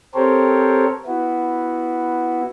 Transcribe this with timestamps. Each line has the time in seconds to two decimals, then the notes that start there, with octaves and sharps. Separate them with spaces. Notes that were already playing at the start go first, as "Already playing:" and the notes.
0.14 C4 G4 A4 A#4 C5 C#5
1.06 B3 E4 F#4